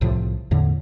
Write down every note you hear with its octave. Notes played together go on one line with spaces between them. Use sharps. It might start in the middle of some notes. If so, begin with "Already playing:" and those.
C2 A2 C3 F3
E2 A2 D3